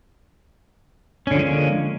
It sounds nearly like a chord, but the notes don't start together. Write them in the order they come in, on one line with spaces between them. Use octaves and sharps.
C#4 D3 F3 G#3 A#3